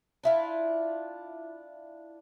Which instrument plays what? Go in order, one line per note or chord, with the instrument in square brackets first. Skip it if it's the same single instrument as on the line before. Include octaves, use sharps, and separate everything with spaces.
[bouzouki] D4 E4 F4